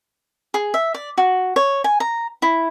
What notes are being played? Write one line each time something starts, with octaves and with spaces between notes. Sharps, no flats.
G#4
E5
D5
F#4
C#5
G#5
A#5
E4